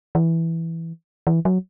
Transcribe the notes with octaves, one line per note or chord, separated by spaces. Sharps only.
E3
E3
F#3